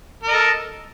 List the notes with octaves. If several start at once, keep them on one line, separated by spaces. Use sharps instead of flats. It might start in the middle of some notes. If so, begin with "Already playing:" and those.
A4 A#4 D#5